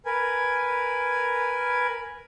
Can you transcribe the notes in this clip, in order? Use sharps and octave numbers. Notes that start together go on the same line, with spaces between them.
A#4 B4 G#5